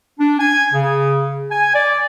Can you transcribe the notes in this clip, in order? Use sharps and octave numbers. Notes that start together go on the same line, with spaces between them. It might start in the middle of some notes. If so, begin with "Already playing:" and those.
D4
G#5
C#3
G#5
D5